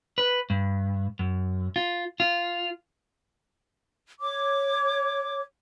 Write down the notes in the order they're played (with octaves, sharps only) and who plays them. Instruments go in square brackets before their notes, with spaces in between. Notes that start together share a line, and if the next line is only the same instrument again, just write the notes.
[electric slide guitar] B4
G2
F#2
F4
F4
[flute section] C#5 D6